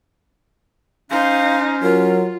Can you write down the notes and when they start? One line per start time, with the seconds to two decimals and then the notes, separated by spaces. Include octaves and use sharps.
1.11 C#4 D#4 C5 F5
1.83 F#3 F4 A#4